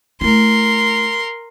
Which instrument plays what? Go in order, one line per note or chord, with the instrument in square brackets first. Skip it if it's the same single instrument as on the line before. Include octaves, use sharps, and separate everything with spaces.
[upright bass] A3 E4 [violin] A#4 C6